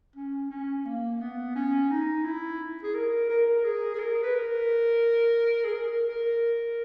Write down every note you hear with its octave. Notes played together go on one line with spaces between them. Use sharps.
C#4
C#4
A#3
B3
C#4
D#4
E4
G#4
A#4
A#4
A#4
G#4
G#4
A#4
B4
A#4
G#4
A#4
A#4